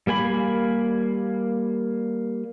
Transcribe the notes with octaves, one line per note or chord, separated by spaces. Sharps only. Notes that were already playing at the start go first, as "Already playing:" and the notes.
G3 A#3 G#5 B5